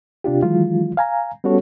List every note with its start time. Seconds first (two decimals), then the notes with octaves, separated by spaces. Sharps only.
0.24 C3 D4 F4 G4
0.42 D#3 E3 F#3 G#3 F4
0.97 F5 G#5 A#5
1.44 G3 B3 C#4 F#4 A4 C#5